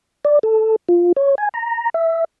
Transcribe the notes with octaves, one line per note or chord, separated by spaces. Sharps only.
D5
A4
F4
C#5
G#5
A#5
E5